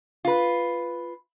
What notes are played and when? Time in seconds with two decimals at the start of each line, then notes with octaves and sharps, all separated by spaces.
0.25 F4 B4